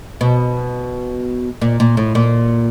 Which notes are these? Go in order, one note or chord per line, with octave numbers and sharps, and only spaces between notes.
B2
A#2
A#2
A2
A#2